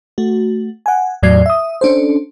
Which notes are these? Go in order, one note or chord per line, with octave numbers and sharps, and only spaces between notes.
A3 F#4
F#5 G#5
E2 A2 F#3 D5 G#6 C7
E5 D#6
C#4 D4 A4 C5